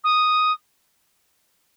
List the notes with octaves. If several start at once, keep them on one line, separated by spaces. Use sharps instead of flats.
D#6